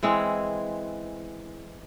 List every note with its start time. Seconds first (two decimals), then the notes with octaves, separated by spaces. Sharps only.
0.03 E3 G#3 C4 E4